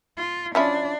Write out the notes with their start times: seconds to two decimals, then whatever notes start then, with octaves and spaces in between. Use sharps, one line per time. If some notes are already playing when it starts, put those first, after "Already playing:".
0.17 F4
0.55 F3 C#4 D4 E4